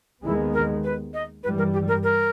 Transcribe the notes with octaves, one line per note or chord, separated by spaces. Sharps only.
D#2 D#3 G#3 B3 E4
A#4
B4
D#5
G2 E3 G3 B4
A#4
G4
A#4
A#4